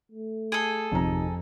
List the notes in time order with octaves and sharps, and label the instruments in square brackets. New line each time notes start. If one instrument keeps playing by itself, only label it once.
[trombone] A3
[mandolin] G#4 A4
[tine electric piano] G#1 C3 D#4 [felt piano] F2 A#5